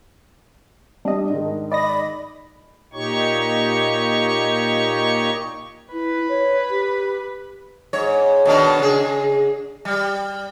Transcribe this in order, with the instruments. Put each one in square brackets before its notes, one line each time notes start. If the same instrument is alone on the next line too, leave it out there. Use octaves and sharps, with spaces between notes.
[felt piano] G3 [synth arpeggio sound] D4 D#5
[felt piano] G#2 D#3
[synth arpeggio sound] D5 D#5 A#6 [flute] B5
[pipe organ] A#2 D#4 G4 C#5 C#6
[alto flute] E4 [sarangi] B4
[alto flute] C#5
G4
[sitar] G#2 C#5
B2 D#3 D4
C#3 G#4
G3